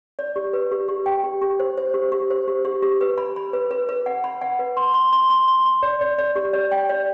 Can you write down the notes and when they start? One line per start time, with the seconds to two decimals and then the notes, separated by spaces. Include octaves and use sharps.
0.19 D5
0.36 G4
0.53 B4
0.71 G4
0.88 G4
1.06 G5
1.24 G4
1.42 G4
1.60 C5
1.77 C5
1.94 G4
2.12 G4
2.30 C5
2.48 G4
2.65 G4
2.82 G4
3.01 B4
3.18 B5
3.36 B5
3.53 B4
3.71 B4
3.89 B4
4.06 F#5
4.24 B5
4.41 F#5
4.59 B4
4.77 C6
4.94 C6
5.13 C6
5.30 C6
5.48 C6
5.66 C6
5.83 D5
6.01 D5
6.19 D5
6.36 G4
6.53 D5
6.72 G5
6.89 D5